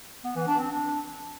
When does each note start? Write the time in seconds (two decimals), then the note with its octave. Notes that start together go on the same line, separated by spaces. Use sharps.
0.24 B3
0.36 E3
0.47 D4
0.59 C4
0.70 D4